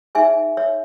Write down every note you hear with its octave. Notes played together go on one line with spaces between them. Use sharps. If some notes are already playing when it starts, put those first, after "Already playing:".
D#4 G#4 C#5 E5 G#5
C#5 E5